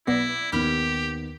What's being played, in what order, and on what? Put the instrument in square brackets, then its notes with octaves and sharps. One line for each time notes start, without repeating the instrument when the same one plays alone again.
[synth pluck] B1 B3 C7 [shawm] E4 [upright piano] D5 A#6
[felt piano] D#2 B3 [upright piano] D#3 [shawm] G4 [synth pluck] B5 F6